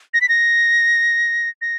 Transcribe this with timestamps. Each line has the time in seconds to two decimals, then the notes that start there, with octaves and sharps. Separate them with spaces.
0.14 A#6
0.21 B6
0.29 A#6
1.62 A#6